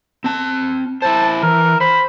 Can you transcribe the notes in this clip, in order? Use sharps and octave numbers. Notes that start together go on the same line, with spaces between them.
C4 A5
E4 C5 A5
E3 A#4
C5 B5